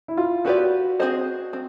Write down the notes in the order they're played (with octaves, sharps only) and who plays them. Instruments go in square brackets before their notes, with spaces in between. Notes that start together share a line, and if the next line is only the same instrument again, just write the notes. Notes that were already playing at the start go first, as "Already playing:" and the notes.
[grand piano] E4
F4
[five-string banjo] B3 E4 G4 B4 D5 [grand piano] F#4
[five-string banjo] C4 F4 G#4 C5 D#5
C4